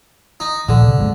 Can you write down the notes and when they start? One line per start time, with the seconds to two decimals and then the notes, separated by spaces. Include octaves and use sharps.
0.40 D#4
0.69 D2 A#2 D3 F3
0.85 C3
0.98 G#2 F#3 G#3